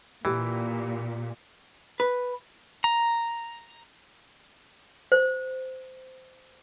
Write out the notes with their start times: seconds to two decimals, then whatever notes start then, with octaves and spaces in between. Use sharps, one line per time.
0.25 A#2 E3 G4
2.00 B4
2.84 A#5
5.12 C5